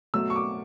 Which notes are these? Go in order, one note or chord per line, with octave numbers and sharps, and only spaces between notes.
B2 F#3 A3 E6
C#6
D6